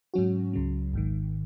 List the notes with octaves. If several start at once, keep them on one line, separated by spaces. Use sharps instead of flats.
G#2 F#3 C#4 F#4
C#2 C#3 F#3
G#1 G#2 D#3